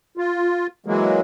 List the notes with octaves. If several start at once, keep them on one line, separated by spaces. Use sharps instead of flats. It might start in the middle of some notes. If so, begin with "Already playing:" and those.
F4
E3 F#3 G#3 A#3